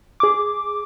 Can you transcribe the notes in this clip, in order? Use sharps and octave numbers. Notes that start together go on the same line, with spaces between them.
G#4 D6